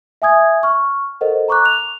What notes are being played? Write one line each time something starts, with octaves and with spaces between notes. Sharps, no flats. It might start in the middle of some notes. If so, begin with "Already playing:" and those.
E5 G#5 D#6 G#6
C#6 F6
A4 A#4 C5 D#5 F#5
A#5 C#6 D6 F#6
F7